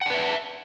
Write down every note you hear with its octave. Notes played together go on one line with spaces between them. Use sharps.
D4 B4 E5 F#5